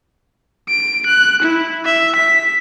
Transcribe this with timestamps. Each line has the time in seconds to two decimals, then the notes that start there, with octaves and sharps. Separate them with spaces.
0.69 D7
1.06 F#6
1.43 E4
1.85 E5
2.16 B6